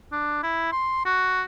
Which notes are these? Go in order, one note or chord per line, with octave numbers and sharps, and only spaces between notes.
D4
E4
C6
F#4